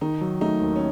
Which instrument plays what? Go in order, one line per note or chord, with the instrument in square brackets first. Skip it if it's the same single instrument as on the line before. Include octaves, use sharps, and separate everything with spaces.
[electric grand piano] D#3 [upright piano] D#4
[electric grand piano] F#3
[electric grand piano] A3 [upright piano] D#4
[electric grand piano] D#2
[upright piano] C#4